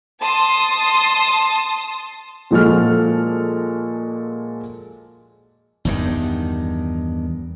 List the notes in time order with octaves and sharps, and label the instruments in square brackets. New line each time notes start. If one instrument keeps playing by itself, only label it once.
[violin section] A5 C6 D#6
[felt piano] A#2 F3 G#3 F#4 A4 F6
[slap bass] E2 G2 D#3